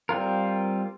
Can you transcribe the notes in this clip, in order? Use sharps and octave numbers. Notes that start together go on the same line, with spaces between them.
G3 C4 F4 A#4